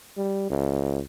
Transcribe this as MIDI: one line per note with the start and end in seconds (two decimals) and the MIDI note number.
0.17 0.45 55
0.50 1.01 37